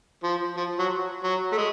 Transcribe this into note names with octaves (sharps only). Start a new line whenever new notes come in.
F3
F3
F#3
F#3
A3
G#3